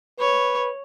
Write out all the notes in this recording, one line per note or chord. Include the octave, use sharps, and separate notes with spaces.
B4 C#5